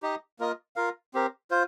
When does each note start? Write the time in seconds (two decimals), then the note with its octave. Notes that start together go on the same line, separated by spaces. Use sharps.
0.02 D#4 G4 D#5
0.39 A#3 F4 A#4 D#5
0.76 F4 A#4 F5
1.14 C4 G4 A#4
1.51 F4 C5